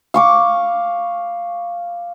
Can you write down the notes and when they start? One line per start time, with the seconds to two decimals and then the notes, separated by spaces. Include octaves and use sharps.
0.14 F5 C#6 D6